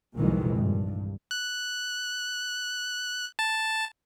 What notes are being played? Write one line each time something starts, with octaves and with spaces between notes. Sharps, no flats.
C2 F2 A#2 D#3 E3 G#3
G2
F#6
A5